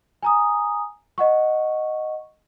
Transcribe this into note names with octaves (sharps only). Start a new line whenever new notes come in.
G#5 A#5 D#6
D#5 F#5 C#6